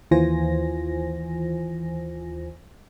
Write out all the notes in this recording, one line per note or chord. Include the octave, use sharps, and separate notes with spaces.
D#2 E3 F4 C5 G#5 A#6